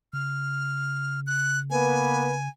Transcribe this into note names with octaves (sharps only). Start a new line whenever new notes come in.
C#3 F6
F#6
A#3 B3 B4 G#5